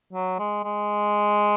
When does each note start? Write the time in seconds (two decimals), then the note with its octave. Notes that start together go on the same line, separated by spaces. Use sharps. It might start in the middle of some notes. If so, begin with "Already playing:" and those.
0.13 F#3
0.39 G#3
0.64 G#3